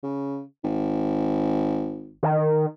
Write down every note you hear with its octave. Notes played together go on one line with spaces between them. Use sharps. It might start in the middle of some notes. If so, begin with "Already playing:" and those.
C#3
G#1
D#3